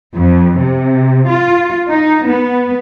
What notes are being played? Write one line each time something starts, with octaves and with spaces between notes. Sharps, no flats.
F2
C3
F4
D#4
B3